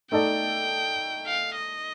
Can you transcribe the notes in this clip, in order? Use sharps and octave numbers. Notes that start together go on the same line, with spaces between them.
A3 D#4 A4 D5 G5
F5
D#5